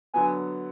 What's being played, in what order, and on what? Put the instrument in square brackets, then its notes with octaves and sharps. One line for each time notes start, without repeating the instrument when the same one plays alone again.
[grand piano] D3 F#3 B3 [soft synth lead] G#5